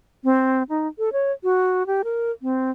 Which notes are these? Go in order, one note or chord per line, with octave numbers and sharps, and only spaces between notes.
C4
D#4
A4
C#5
F#4
G4
A#4
C4